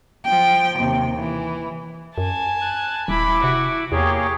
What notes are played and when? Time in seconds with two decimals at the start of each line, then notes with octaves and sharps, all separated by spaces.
0.25 F3 G5
0.79 D#2 C3
1.19 E3
2.18 F#2 G#5 A5
2.61 F#6
3.08 D#1 E4 B5 D6
3.44 C3 F#4
3.92 E2 A#3 G4 G#4 C#5